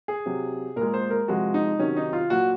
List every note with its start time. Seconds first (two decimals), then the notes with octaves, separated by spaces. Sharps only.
0.08 G#4
0.26 C3 F#3
0.76 A#2 G#3 A#4
0.94 C5
1.10 A#4
1.28 C3 F3 G#3 F#4
1.54 D#4
1.79 C3 D#3 F#3 C#4
1.97 D#4
2.13 F4
2.30 A#2 F#3 F#4